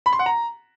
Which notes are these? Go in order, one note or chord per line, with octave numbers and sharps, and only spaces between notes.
B5
C6
F#5
A#5